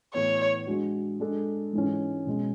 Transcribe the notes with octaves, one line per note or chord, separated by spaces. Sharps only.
A2 E3 B3 C#5
G#3 D4 F#4
G#3 D4 A4
G#2 E3 G#3 C#4
B2 G#3 C#4